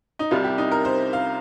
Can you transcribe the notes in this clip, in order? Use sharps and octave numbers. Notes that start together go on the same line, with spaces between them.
D#4
C2 C3 G3 F4
G4
D#4
A#4
C5
F5